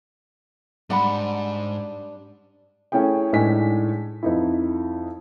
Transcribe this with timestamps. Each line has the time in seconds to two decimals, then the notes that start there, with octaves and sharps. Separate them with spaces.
0.90 G#2 G3 D4 D5 F#5 B5
2.92 A3 C#4 E4 G#4 G5
3.33 A2 G#3 D4 D#4 G#5 B6
4.23 F2 D#4 E4